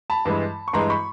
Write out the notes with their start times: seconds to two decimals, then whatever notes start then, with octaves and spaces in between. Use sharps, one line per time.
0.10 A5 B5
0.25 G2 E3 G#3
0.68 C#6
0.73 G2 E3 G#3 A#5 C6
0.90 B5 C#6